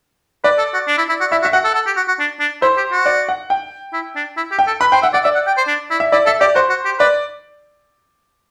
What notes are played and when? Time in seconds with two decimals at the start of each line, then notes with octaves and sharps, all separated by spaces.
0.44 B4 D5
0.58 A4
0.74 F#4
0.88 D4
0.98 E4
1.09 E4
1.21 F#4
1.32 E4 E5
1.42 F#4
1.45 E5
1.53 F#4 F#5
1.65 A4
1.75 A4
1.87 G4
1.97 F#4
2.08 F#4
2.19 D4
2.40 D4
2.62 E4 C5
2.77 G4
2.92 F#4
3.06 D5
3.29 F#5
3.50 G5
3.93 E4
4.16 D4
4.37 E4
4.52 G4
4.59 G5
4.67 A4
4.81 B4 B5
4.92 C5 G5
5.02 E5 F#5
5.14 D5 F#5
5.24 D5 E5
5.35 F#5
5.47 G5
5.58 C5
5.68 D4
5.91 E4
6.00 E5
6.12 E4 D5
6.26 A4 E5
6.41 G4 D5
6.55 F#4 C5
6.70 F#4
6.85 G4
6.99 B4 D5